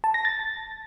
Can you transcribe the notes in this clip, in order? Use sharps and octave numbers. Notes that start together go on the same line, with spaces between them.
A5
A#6
A6